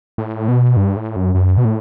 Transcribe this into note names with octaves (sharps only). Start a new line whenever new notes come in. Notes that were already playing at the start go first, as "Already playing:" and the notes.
A2
B2
G2
A2
F#2
F#2
B2
A2